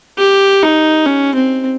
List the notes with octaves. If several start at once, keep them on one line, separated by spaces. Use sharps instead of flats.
G4
D#4
C#4
C4